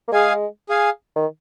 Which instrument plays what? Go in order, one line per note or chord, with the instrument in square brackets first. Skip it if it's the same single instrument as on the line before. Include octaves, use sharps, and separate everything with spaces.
[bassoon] A#3
[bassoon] G#3 [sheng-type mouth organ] G#4 F5 G#5
[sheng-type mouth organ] G#4 F5 G#5
[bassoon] D#3